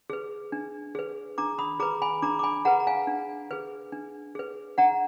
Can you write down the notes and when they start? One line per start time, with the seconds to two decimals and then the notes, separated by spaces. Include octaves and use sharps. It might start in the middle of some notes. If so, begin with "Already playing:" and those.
0.10 G#4 B4
0.52 D4
0.95 G#4 B4
1.38 D4 A#5 D6
1.59 B5 D#6
1.80 G#4 B4 A#5 D6
2.02 G#5 B5
2.22 D4 A#5 D6
2.39 D6
2.43 G#5 B5
2.65 G#4 B4 F#5 A#5
2.80 A#5
2.87 F5 G#5
3.07 D4
3.51 G#4 B4
3.92 D4
4.35 G#4 B4
4.78 D4 F#5 A#5